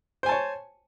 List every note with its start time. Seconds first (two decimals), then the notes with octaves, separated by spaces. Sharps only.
0.23 C5
0.26 G#5
0.29 A5
0.32 C#5